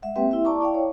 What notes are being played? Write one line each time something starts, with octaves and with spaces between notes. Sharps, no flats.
G#3 E5 F#5
A#3 C4 G4 B4 E5 G5
E4 E5
D5 A5 A#5 C#6 D6
E4 D5 F5 G5
C#5